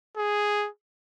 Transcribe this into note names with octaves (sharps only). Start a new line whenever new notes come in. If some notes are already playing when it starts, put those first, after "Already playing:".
G#4